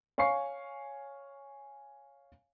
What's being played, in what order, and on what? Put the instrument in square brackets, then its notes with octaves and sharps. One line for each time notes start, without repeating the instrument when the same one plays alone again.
[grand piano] C#5 F5 G#5 C#6 C7